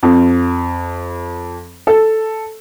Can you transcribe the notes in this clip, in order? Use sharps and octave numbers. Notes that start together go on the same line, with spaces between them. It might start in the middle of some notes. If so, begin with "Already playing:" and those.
F2
A4